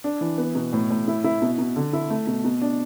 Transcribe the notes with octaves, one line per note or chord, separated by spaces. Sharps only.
D4
E3
B3
B2
A2
A2
E4
E4
B2
B2
D3
E4
A3
B2
B2
D4